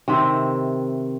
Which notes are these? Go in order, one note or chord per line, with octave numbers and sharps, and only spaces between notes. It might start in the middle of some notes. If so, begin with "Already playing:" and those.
C3 D#3 C4 E5